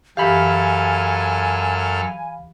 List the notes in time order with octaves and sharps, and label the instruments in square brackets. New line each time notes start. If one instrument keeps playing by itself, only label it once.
[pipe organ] F#2 A4 F6 [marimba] E3 G4 [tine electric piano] F5 B5 [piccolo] G#5